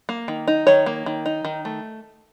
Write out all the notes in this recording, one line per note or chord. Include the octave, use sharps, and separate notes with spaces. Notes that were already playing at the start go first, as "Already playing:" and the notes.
A#3
D#3
D#4
D#3 C#5
A#3
D#3
D#4
D#3
A3